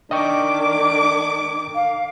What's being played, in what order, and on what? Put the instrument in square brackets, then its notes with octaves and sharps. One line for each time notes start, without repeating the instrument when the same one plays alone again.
[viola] D#3 D6 [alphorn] D4 [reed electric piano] D#5 G5 C#6
[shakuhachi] F5